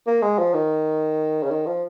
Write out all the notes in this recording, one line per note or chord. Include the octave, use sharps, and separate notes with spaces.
A#3
G#3
F3
D#3
C#3
D#3
F3